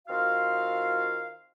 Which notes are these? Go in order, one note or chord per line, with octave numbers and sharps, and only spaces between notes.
D#3 C4 F4 F#4 F5